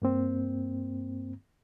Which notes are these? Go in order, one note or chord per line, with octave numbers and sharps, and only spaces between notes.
G2 A#3 C4